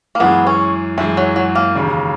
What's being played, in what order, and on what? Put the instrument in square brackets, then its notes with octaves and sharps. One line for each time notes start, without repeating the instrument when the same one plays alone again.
[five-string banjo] A#3
[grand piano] F#2 E3 G#3 [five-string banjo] B3
[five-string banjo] C#4
[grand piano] F#2 E3 G#3 [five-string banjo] E4
[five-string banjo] F#3
F#3
A#3
[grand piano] E1 D#2 C#3